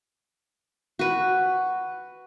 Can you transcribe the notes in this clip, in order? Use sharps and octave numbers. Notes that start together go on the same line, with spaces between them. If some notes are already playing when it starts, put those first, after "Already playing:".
F#4 B4